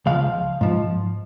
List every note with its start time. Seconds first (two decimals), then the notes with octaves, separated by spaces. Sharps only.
0.06 C#2 C#3 F3 F5
0.61 G#2 F3